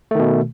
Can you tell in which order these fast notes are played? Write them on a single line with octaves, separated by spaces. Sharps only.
A3 D#3 B2